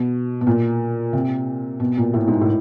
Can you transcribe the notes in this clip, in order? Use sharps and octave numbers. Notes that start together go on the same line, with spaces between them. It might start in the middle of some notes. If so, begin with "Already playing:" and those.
Already playing: B2
B2
A#2
C3
B2
A#2
A2
G#2
A2